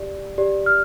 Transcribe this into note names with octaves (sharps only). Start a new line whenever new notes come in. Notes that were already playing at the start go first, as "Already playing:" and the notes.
Already playing: G4 D5
G4 D5
F6